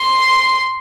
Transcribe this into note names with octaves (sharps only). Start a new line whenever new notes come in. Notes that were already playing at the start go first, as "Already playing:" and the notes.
Already playing: C6